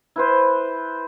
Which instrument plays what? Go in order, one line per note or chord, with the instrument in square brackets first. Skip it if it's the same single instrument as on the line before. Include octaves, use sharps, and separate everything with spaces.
[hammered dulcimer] E4 B4 C5